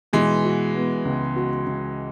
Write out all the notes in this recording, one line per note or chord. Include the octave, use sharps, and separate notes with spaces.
B2 E3 G#3
F#4
B3
C#2
F#4
C#2